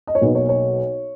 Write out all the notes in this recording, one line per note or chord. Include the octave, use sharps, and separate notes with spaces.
D#5
C#5
B1 B2 A#3 D#4 B4
C#5
C#5